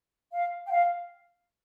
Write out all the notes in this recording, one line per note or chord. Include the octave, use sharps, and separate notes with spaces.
F5
G5
F5